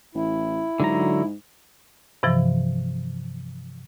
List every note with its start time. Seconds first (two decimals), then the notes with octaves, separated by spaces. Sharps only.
0.15 A1 E4
0.80 G#2 D3 F#3 A#5
2.23 G2 C3 E3 F3